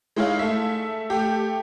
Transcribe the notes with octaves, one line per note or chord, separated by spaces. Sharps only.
G#3 D#4 E4 G#4 C#5 F5
A3 E5
A3 G4